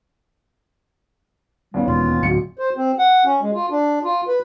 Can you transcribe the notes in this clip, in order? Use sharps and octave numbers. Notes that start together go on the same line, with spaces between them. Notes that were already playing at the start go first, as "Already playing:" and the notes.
D#2 G3 B3 C#4
E1 F4
D1 F#4 C#7
C5
C4
F#5
C#4
G#3
F4
D4
F4
B4